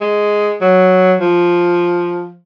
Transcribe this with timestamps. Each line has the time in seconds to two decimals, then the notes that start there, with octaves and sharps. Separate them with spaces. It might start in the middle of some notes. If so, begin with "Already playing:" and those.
0.01 G#3
0.61 F#3
1.20 F3